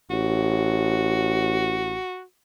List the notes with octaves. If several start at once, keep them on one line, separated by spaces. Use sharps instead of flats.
A1 F#4